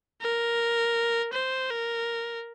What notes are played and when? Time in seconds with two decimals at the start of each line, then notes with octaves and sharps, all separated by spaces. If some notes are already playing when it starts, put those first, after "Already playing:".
0.22 A#4
1.34 C5
1.70 A#4